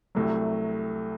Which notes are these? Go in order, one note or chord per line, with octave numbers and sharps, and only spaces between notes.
C2 C3 F#3 A3